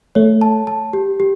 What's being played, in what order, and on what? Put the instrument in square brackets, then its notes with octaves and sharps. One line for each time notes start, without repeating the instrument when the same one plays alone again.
[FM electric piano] A3 [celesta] C#5
[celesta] A5
A5
G4
G4